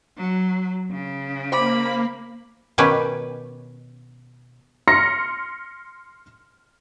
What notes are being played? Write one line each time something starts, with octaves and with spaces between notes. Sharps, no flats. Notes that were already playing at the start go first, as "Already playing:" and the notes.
F#3
C#3
A#3 C5 B5 D6
B2 D#3 C#4 G4 B4
C6 F6 A#6 C#7